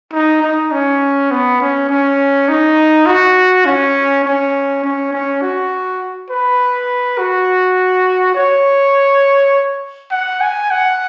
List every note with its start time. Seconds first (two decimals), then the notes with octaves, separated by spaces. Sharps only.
0.13 D#4
0.42 D#4
0.72 C#4
1.31 B3
1.61 C#4
1.90 C#4
2.48 D#4
3.06 F#4
3.66 C#4
4.25 C#4
4.84 C#4
5.13 C#4
5.42 F#4
6.30 B4
7.18 F#4
8.35 C#5
10.11 F#5
10.41 G#5
10.71 F#5